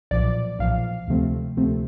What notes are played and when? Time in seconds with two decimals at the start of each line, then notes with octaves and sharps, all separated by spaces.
0.11 B1 A#2 F3 D5
0.59 B1 A#2 F3 F5
1.08 D2 C3 F3 A3 C4
1.57 D2 C3 F3 A3 C4